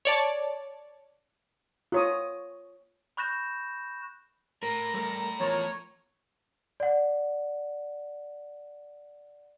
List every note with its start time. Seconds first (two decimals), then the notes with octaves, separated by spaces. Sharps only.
0.05 C#5 D5 A5
1.92 F4 C#5 D#6
3.17 B5 C#6 F#6 G6 A#6 E7
4.63 A2 A#4 A#5
4.94 G3 A4 A#4
5.40 E2 F3 A#4 C#5
6.80 D5 F#5